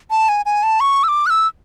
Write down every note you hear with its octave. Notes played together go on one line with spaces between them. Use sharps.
A5
G#5
G#5
A5
C#6
E6
D6
F#6
E6